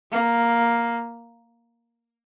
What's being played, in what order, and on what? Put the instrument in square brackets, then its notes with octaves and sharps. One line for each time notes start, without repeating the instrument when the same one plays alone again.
[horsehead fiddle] A#3